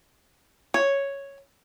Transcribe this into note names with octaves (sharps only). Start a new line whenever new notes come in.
C#5